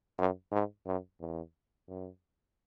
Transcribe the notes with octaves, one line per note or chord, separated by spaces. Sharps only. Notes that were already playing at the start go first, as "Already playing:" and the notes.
F#2
G#2
F#2
E2
F#2